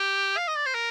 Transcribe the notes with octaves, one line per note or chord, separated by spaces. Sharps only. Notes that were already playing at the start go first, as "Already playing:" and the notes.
Already playing: G4
F5
D#5
D5
C5
A#4